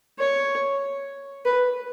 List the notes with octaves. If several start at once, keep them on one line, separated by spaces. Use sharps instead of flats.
C#5
B4